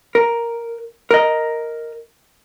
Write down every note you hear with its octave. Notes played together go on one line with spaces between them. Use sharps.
A#4
A#4 D#5